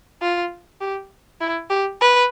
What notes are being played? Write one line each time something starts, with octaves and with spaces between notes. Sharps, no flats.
F4
G4
E4
G4
B4